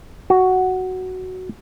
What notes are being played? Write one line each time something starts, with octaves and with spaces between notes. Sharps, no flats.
F#4